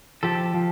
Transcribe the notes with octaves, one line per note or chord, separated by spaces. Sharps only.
F3 G4 A4
F3